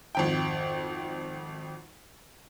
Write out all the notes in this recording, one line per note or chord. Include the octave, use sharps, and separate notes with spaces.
G#1 F2 G5